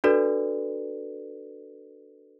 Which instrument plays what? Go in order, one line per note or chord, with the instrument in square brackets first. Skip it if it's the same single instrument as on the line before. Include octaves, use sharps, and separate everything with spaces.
[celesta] D4 F#4 A4 B4 D5